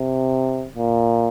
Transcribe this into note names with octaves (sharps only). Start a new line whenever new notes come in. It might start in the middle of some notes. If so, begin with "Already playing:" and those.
Already playing: C3
A#2